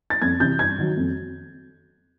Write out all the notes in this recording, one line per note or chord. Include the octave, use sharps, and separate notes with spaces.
A6
F2 G#6
C3 E3 G6
G2 G#6
D#3 F#3
F2